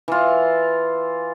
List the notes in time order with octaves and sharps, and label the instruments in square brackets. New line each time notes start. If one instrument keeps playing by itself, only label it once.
[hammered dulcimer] E3 F4